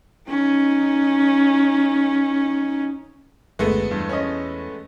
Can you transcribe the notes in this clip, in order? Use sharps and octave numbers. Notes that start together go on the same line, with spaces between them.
C#4 D#4
F#1 D2 G#3 A3 B3
E2 G2
C#4 D#5